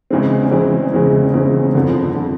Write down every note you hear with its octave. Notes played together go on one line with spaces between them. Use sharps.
E2 C#3 E3 G#3 C4
E2 C#3 E3 G#3 C4
E2 C#3 E3 G#3 C4
E2 C#3 E3 G#3 C4
G1 F2 D3
D3